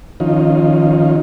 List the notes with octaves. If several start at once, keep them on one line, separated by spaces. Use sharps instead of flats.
D#3 F3 C#4 D#4 F4